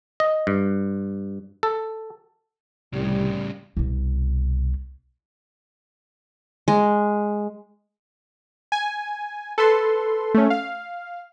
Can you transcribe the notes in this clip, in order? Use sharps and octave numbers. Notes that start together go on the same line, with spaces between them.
D#5
G2
A4
C2 A2 C#3 G3
C2 B2
G#3
G#5
A4 B4 C6
A3 C#4
F5